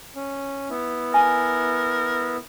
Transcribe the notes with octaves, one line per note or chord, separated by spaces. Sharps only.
C#4
B3 E4
A#4 G#5